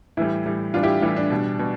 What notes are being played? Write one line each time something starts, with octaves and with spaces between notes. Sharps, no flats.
A2 E3 G3 E4
A2 E3 G3
A2 E3 G3 D4 F4
E4 G4
A2 E3 G3 E4
D4
B2 G3
B2